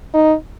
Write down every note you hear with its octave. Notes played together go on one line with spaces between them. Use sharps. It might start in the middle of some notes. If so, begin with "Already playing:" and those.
D#4